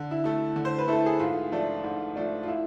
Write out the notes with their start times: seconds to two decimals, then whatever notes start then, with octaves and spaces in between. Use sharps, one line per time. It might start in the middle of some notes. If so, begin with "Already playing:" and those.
Already playing: D3
0.11 E4
0.24 A3 E4
0.56 D3
0.65 C5
0.78 B4
0.88 A3 E4 A4
1.06 G#4
1.19 G#2 F4
1.52 F3 A3 D4
1.84 G#2
2.16 F3 A3 D4
2.43 F4
2.48 E4